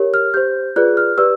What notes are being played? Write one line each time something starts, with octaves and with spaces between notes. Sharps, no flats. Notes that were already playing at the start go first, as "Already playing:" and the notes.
Already playing: G4 A#4 C#5
F6
G4 C5 G6
F4 G#4 B4 D5 F#6
F6
G4 B4 D5 E6